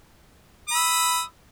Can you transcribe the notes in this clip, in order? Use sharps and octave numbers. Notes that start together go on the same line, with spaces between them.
B5 D#6 E6